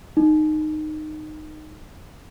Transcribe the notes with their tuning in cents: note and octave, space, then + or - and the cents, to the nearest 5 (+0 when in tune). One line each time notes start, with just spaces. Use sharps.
D#4 -15